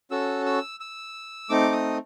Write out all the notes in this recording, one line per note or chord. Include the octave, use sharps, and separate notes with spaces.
C#4 F#4 A4 E6
E6
E6
A3 C4 D#4 D6
D#6